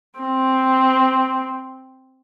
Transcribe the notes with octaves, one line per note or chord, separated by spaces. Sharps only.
C4